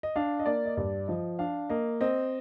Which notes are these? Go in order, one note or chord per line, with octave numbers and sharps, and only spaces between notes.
D#5
D4 F5
D#5
A#3 D5
D#5
G2 D5
F3 D#5
D4 F5
A#3 D#5
C4 D#5